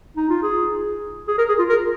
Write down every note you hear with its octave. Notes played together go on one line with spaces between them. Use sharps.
D#4
F4
G#4
G#4
A#4
G#4
F4
A#4